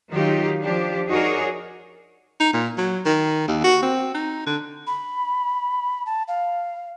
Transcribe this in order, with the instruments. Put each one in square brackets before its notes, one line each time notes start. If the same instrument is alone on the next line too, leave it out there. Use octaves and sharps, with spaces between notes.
[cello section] D#3 F#3 D#4 F4 G4
F3 D4 G4
D#4 F#4 G#4 A#4 C#5 D5
[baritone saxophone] D#4
A#2
F#3
D#3
D#2
F#4
C4
D#4
D3
[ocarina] B5
A5
F5